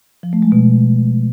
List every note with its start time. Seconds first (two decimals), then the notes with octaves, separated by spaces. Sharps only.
0.23 F3
0.33 A3
0.42 G#3
0.52 B2